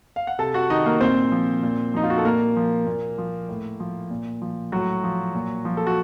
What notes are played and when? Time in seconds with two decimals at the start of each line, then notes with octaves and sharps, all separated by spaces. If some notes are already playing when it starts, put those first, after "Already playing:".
0.16 F5
0.27 F#5
0.39 C3 A4 A5
0.54 F#4 F#5
0.70 D#3 D#4 D#5
0.86 A#3 A#4
1.01 A#2 C4 C5
1.32 F3
1.63 A#2
1.94 F3 D#4
2.03 F4
2.10 F#4
2.18 A4
2.25 A#2 A#3 A#4
2.56 F3
2.86 A#2
3.18 F3
3.49 A2
3.80 F3
4.10 A#2
4.42 F3
4.72 A2 F#3 F#4
5.03 F3
5.35 A#2
5.65 F3
5.77 A4
5.87 F#4